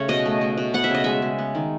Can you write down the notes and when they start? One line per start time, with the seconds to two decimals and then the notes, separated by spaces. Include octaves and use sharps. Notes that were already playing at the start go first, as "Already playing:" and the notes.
Already playing: C#3 A3 C#5
0.08 B2 D#5
0.26 A3
0.41 A3
0.57 B2
0.74 B3 F#5
0.84 E5
0.90 C#3 D#5
1.04 G#3 E5
1.22 C#3
1.39 B3
1.55 D#3